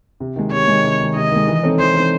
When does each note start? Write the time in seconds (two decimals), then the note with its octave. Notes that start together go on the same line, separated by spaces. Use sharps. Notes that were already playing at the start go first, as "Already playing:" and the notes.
0.20 C3
0.36 D#3 G#3
0.52 C3 C#5
0.68 D#3 G#3
0.84 C3
1.00 D#3 G#3
1.16 C3 D#5
1.31 D#3 G#3
1.48 E3
1.63 C4 D#4 A4 C#5
1.79 E3 C5
1.95 C4 D#4 A4 C#5